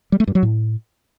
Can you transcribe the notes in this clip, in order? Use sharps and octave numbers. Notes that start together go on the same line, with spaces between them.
G3
A3
G2
F#3
A2